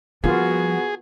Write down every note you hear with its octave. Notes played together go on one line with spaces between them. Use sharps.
F3 G3 A#3 B3 F4 F#4 G#4